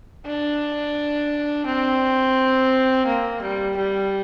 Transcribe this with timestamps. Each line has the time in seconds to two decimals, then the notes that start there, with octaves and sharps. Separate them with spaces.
0.26 D4
1.66 C4
3.07 A#3
3.42 G3
3.77 G3